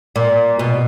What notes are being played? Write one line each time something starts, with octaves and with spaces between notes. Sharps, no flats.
A#2
B2